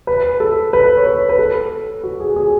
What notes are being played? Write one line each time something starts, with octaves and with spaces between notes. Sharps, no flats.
B4
A4
B4
C#5
B4
B4
A4
F#4
G#4
G#4